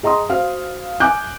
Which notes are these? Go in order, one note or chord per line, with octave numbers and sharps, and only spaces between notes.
G#4 D#5 A#5 C6 D#6
F#4 C5 F5 F6
G#5 D6 F#6 G6